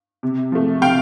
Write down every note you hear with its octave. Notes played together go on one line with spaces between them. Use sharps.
C3
F3 A3
C3 F5 G5